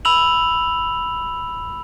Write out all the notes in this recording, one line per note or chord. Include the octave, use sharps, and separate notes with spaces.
B5 E6 F7 F#7